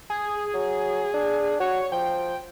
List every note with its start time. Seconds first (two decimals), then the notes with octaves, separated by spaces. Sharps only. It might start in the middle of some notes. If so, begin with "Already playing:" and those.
0.10 G#4
0.54 F#3
1.14 D4
1.60 F#4 C#5
1.92 F3 G5